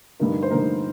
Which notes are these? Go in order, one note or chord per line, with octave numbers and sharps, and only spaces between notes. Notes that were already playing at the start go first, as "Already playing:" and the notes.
G2 D3 F3 A#3 D#4
C5
G2 D3 F3 A#3 D#4 A#4